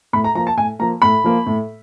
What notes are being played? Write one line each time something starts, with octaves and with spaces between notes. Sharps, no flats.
A2 B5
A#5
F3 A#3 A#5
A5
A2 G#5
F3 A#3 A#5
A2 B5
F3 A#3
A2